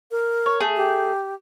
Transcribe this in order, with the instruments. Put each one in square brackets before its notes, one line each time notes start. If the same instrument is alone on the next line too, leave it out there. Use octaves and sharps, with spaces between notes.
[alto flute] A#4
[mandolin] C#5
A3 G#4
[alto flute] G4